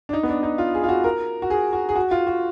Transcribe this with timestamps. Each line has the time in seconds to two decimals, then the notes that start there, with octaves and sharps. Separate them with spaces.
0.09 D4
0.13 D#4
0.23 B3
0.29 D4
0.43 D#4
0.58 F4
0.75 G#4
0.84 F4
0.89 F#4
1.04 A#4
1.42 F#4
1.50 G#4
1.73 F#4
1.89 G#4
1.96 F#4
2.11 F4
2.27 F#4